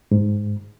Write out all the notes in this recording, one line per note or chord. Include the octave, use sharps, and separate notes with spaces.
G#2